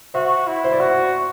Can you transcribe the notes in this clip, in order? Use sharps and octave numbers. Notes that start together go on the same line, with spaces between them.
F#4 C5 E5
E4
C5
D5
F#4 C5 E5